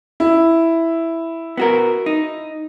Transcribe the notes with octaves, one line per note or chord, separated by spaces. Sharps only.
E4
B3 F#4 A#4
D#4